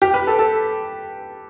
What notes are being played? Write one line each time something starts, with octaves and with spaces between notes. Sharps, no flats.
G4
B4
A4
A4